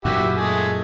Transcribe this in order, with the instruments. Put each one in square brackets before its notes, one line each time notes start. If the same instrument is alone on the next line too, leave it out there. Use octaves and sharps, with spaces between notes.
[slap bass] F#2 A#2 [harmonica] E4 F#4 G4
[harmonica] G#3 A3 G#4